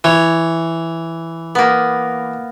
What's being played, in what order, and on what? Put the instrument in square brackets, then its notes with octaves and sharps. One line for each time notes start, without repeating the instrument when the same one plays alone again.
[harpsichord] E3 [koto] C#5
[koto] A#3 B3